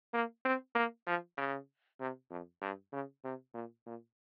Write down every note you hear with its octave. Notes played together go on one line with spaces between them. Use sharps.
A#3
C4
A#3
F3
C#3
C3
F2
G2
C#3
C3
A#2
A#2